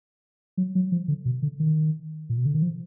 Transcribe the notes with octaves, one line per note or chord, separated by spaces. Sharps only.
F#3
F#3
F3
D3
B2
D3
D#3
A#2
B2
D3
D#3
F3